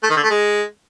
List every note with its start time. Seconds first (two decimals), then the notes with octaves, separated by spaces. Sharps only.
0.03 A3
0.10 D#3
0.17 D3
0.23 A3
0.30 G#3